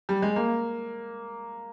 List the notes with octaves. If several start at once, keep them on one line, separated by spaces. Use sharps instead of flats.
G3
G#3
A#3